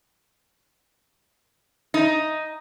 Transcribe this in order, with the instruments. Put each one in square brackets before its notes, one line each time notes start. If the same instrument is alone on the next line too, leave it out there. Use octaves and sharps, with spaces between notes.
[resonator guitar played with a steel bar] D#4